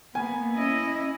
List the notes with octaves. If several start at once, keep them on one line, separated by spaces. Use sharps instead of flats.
A#3 B3 G#5
C#4 E4 D#5